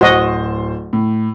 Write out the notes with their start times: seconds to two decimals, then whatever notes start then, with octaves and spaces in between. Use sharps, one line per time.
0.01 D1 F#4 C5 D#5
0.93 A2